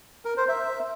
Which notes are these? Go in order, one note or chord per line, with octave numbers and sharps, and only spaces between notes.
A#4
C5
E5